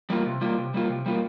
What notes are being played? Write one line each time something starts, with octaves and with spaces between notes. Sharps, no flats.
G3 A#3 F4
C3
G3 A#3 F4
C3
G3 A#3 F4
C3
G3 A#3 F4